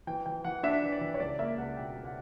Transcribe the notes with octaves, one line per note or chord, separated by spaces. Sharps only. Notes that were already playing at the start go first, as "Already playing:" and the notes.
E3 G5
E3 G5
E3 F#5
D4 E5
E3
D5
E3
C#5
C#2 D5
A#3 E5
C#2 F#5
B2 G5
C#2
F#5